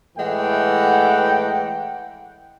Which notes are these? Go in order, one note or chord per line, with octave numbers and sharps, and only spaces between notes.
A2 E3 G#3 F#5 G5